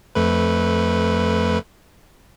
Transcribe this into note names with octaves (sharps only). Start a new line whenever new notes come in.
F2 A3 B4